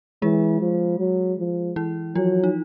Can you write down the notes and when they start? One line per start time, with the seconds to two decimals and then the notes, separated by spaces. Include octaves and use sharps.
0.22 E3 G#3 G#4
0.62 F3
0.99 F#3
1.39 F3
1.76 E3 E4
2.15 F3 F#3 F4
2.44 D#4